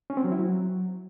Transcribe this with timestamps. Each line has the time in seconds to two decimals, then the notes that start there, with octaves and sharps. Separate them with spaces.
0.10 C#4
0.17 C4
0.24 F#3
0.32 E4
0.39 F#3